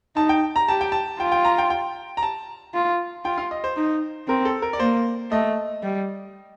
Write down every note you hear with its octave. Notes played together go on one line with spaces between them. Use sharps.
D#4 A5
G5
A#5
G4 A5
G5
A5
F4 G5
G5
A#5
G5
G5
A#5
A5
F4
F4 G5
F5
D#5
C5
D#4
C4 A#4
A4
A#4
D5
A#3 C5
A3 D#5
G3